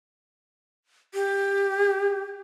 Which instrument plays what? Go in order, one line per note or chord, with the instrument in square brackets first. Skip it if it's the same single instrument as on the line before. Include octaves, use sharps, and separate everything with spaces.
[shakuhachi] G4